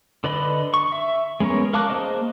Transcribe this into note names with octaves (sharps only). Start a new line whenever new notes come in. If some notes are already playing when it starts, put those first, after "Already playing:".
D3 B4 D5 D#5 B5
C#6
E5
G#3 B3 C#4 A#4 C#5
A#4 F5 A5 D6 F#6
A#3 D#4 G#4 C5 D#5